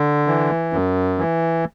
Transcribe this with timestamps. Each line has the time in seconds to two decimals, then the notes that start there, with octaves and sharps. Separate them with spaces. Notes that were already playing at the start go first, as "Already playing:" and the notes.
Already playing: D3
0.27 E3
0.73 F#2
1.18 E3